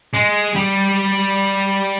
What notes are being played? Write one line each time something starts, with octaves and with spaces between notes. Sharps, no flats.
G#3
G3